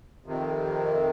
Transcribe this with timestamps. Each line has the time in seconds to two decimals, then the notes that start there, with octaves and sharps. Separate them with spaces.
0.24 F2 C3 D#3